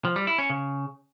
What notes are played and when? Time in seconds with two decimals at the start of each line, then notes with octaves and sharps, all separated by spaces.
0.05 F3
0.16 G3
0.27 E4
0.38 C#4
0.50 C#3